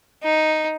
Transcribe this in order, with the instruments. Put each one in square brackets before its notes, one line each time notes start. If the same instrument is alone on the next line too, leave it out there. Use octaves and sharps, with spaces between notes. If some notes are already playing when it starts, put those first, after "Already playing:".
[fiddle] D#4